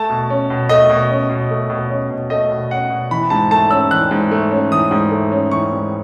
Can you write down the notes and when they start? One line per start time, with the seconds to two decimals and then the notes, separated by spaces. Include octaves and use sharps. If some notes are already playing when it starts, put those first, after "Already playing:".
Already playing: A3 A5
0.10 B2
0.30 C#4
0.50 B2
0.69 A3 D#5
0.90 B2
1.10 C#4
1.30 B2
1.51 A3
1.70 B2
1.91 C#4
2.10 B2
2.30 A3 D#5
2.51 B2
2.71 C#4 F#5
2.90 B2
3.11 E3 B5
3.30 G#2 A5
3.51 A3 A5
3.71 C#4 E6
3.91 E3 F#6
4.11 G#2
4.31 A3
4.51 C#4
4.71 E3 D#6
4.91 G#2
5.11 A3
5.32 C#4
5.51 E3 C#6
5.72 G#2